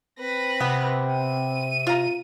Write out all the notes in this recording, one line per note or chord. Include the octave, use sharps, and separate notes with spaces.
C4 B4 A#6
C3 B3
D#7
F4 A#5